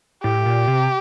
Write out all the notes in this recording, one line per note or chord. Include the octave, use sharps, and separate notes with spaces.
A2 G4
A#2
C3